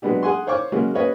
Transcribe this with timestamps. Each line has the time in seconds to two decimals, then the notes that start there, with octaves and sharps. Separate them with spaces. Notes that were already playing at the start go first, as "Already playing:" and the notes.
0.02 F#3 G#3 B3 D4 G4
0.23 G#4 F#5 G#5 C6
0.47 C5 C#5 F5 C#6 D6
0.72 C#3 F#3 G#3 A#3 C#4
0.94 C#4 G4 B4 C#5 D#5